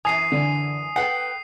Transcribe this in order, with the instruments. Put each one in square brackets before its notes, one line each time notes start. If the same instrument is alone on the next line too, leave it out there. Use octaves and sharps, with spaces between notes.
[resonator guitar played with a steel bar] F#2 E3 [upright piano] G#5 [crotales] D#6 C7 D#7
[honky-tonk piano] D3
[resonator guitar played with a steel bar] A4 B4 F#5 [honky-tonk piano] G5 [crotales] C7